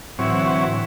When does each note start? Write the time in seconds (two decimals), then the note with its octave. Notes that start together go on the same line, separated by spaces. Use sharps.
0.19 A2 D3 E3 F#3 C4 E4 C#5